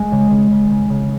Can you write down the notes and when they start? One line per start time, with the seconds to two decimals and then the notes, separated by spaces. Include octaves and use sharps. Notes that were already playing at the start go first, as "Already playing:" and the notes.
Already playing: G#3
0.12 C#3
0.31 C#3
0.51 C#3
0.70 C#3
0.90 C#3